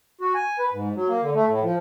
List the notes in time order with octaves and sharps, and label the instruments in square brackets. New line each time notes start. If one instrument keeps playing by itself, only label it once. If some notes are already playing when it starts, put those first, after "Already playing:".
[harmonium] F#4
G#5
B4
G#2
F#3
A#3
D3
A3
A2
F3